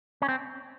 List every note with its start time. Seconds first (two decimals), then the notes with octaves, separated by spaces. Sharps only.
0.22 C#4
0.29 C4